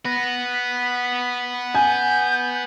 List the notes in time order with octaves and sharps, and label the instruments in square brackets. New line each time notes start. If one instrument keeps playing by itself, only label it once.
[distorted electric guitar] B3 B4 [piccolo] A#6
[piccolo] B6
[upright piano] G#5 [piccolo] G6